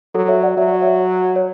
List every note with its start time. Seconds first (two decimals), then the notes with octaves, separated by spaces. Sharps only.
0.15 F#3 A4
0.28 C#5 E5
0.43 D5 F#5
0.57 F#3 E5
0.70 D5
0.82 C#5 E5
1.36 C#5